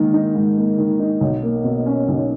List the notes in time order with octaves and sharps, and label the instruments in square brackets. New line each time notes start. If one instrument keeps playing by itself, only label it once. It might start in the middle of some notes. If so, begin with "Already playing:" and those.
Already playing: [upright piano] G#2 D#3 A#3
D#4
G#2
A#3
D#3
D#4
B1
A#3
B2
C#4
B1